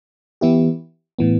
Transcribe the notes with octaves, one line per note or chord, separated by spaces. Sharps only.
E3 B3 E4 G4
A2 E3 B3